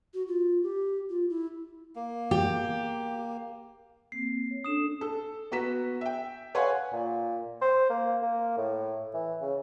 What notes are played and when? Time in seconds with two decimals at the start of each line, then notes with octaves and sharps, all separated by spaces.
0.14 F#4
0.28 F4
0.63 G4
1.10 F4
1.30 E4
1.96 A#3
2.31 G4
4.12 A#3 C4 C7
4.51 C#5
4.64 C#4 D4 A4 D#6 E7
5.01 A4
5.52 B3 F#4 A#5 B6 E7
6.01 E5 G5
6.54 B4 C#5 F5 F#5 G#5 C6
6.93 A#2
7.62 C5
7.90 A#3
8.23 A#3
8.57 A2
9.14 E3
9.41 C#3